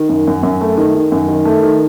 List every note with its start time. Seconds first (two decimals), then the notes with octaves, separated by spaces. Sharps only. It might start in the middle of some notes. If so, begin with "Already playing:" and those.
Already playing: D#3
0.09 F#2
0.27 F#2
0.43 F#2
0.61 A3
0.78 D#3
0.95 D#3
1.12 F#2
1.28 D#3
1.45 A3
1.63 D#3